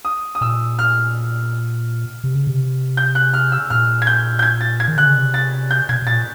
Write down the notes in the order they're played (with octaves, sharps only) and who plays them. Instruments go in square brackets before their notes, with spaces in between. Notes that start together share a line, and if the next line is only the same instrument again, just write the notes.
[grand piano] D#6
D#6
[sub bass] A#2 [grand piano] E6
[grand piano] F6
[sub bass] C3
C#3
C3
[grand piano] G6
F#6
F6
E6
[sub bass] A#2 [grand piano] F6
[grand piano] G#6
G6
G6
G#6
A6
G#6
[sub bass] D#3
[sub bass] D3 [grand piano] F#6
[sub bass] C#3
C3
[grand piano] A6
G6
[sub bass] B2 [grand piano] G#6
[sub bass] B2
[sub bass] A#2 [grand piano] A6